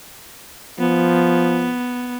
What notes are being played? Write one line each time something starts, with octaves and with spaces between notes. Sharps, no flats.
F3 B3